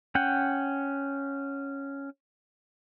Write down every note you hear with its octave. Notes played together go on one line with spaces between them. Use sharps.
C#4 F#5 G5